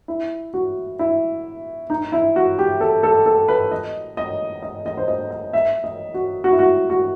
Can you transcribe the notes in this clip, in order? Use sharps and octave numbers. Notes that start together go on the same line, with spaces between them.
E4
F#4
E4
D#4
E4
F#4
G4
A4
A4
A4
B4
D#5
D#5
D#5
D#5
C5
D#5
D#5
E5
D#5
F#4
F#4
E4
F#4
F#4